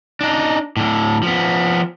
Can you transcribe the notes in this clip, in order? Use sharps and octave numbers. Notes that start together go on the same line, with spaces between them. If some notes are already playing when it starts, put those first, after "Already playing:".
D4 D#4
A2 D3
F3 B3